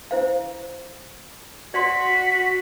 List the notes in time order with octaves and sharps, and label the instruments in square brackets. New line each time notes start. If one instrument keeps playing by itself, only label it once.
[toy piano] E4 C5 F5
[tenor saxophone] F#4 [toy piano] D5 C6 [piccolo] B6